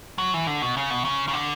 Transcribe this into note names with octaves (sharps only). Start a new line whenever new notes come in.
F#3
E3
D3
B2
C#3
B2
C#3
C#3
D3